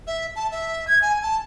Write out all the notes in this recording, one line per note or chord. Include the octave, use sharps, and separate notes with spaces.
E5
A5
E5
G#6
G#5
A5